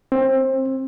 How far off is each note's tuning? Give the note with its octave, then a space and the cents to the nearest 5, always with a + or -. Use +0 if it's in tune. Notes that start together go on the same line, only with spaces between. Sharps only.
C4 +20